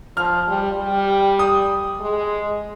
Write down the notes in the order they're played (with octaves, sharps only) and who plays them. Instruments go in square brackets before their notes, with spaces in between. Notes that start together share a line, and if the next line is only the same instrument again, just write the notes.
[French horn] F3 [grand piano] F6
[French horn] G3
G3
[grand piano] D#6
[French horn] G#3